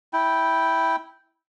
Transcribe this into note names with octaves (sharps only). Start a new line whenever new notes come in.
E4 G5